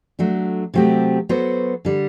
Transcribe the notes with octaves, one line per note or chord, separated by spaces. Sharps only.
F#3 A3 D4
C3 F#3 A3 C4 G4
F#3 B3 F#4 A4 C5
D3 G3